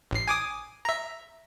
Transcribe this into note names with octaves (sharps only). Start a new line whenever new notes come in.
A1 C7
G#5 D6 D#6
E5 A#5